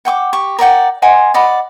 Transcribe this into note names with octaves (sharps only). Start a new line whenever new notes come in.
F#5 G5 C#6 D6
G4 C#6
A#4 D5 F#5 G5
D#5 F#5 G#5 C6
D5 D#5 F#5 B5